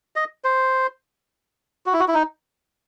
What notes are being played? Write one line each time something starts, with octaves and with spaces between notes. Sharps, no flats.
D#5
C5
F#4
E4
F#4
E4
D#4